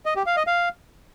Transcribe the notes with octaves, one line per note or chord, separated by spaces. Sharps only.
D#5
G4
F5
D#5
F5